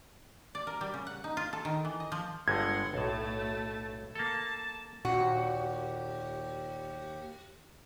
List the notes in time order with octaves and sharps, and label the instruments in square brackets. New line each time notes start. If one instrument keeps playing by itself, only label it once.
[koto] D5
A#4
G3
C#3
F#5
D#4
F4
A4
D#3
E3
D#5
F3
[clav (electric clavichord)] G1 G2 G#3 [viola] F#5 C6 [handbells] G#6
[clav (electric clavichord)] B1 A2 [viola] A3 A5
[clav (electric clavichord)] A#3 A4 [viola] A5
[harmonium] D#2 G4 [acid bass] A#2 [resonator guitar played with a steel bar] F#4